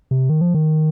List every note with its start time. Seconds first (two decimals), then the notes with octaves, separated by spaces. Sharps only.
0.11 C3
0.30 D#3
0.41 F3
0.54 D#3